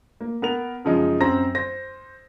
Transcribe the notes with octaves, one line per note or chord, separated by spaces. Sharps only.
A#3
B3 A#4 F7
F#2 C#3 F3 G#3 D#4
F#2 C4 C5 A#5 A#6
C5 A#6